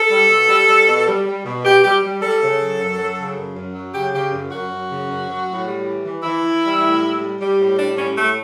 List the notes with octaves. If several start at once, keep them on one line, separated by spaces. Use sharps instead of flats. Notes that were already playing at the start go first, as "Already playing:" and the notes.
Already playing: A4
G3
B2
G3
G3
B2
G3
G3
B2
B2 G4
G3 G4
G3
G3 A4
C#3
F#3
F#2
F#3
C#3
F#2
F#2
F#3
C#3 G4
C#3 G4
F#2
F#2 F#4
F#2
C#3
F#2
F#3
A2
G3
E3
E3
E3 E4
E3
G3
A2
G3
G3
G3
A2
G3 D4
A2 C#4
A2 A3